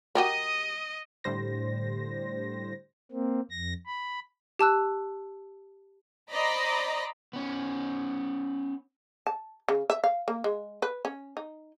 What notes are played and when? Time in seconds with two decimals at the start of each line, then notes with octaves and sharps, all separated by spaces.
0.15 F#4 G4 A#4 D#5 D#6
1.24 A2 D3 G3 C5 A#6
3.12 A#3 C4
3.51 F2 A#6
3.86 B5
4.59 G4 A5 E6 F#6
6.31 C5 D5 D#5 A#5 B5 A#6
7.33 B3 C#4
9.27 A5
9.68 C#3
9.90 E5
10.04 F5
10.28 A#3
10.44 G#3
10.82 B4
11.05 C#4
11.37 D#4